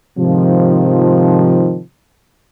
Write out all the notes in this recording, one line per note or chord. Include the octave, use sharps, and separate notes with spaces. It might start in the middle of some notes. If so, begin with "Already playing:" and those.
G#2 C3 D#3 F3